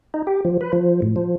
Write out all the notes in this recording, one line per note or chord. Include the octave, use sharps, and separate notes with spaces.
D#4
G4
F3
B4
F3
A2
F3